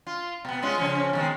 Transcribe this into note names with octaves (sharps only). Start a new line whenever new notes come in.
F4
B2 B3
G#3 C#4 F4
C#3 F3 C#4
B2 D#3 G#3